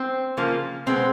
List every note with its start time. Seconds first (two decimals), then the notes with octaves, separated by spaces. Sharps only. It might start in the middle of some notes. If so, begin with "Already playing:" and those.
Already playing: C4
0.37 C#3 F3 A#3
0.86 B2 G#3 B3 C4